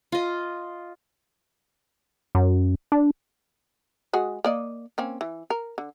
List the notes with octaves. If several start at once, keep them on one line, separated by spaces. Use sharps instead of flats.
F4 D#5
F#2
D4
G#3 F#4 G#4
A#3 D5 D#5
A#3 C4 C#4
E3
A#4
D3